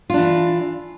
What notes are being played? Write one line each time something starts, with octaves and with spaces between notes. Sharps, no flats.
E3 D4 F4